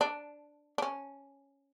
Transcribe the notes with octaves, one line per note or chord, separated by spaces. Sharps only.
D4
D4
C#4